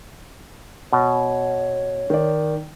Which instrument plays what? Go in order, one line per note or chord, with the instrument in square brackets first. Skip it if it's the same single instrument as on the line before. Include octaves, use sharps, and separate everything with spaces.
[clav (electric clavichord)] B2 [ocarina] C#5
[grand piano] D#3 D5